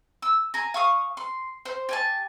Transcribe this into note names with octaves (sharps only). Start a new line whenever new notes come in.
E6
G#5 A#5
F5 C#6 D#6
C6
C5
G4 G#5 A5